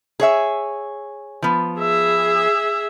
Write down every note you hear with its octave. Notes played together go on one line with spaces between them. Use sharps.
G#4 C#5 E5
F3 B3
G#4 E5